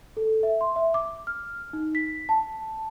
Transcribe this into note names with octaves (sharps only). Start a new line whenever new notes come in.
A4
E5
C6
E5
D6
F6
D#4
B6
A5